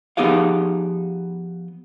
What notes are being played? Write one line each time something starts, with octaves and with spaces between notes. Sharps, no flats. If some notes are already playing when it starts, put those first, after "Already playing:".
F3 B3 D#4 G4 G#4 F5